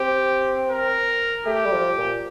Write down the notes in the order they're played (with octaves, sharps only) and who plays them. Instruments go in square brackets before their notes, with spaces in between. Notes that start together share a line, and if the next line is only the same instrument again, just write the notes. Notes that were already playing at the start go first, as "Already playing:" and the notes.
Already playing: [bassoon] C4 [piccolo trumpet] G4
[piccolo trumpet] A#4
[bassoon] A3 [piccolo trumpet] G4
[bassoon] G3
F3
A#2